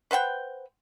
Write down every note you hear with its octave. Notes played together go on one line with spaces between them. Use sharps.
B4 C5 F#5 G5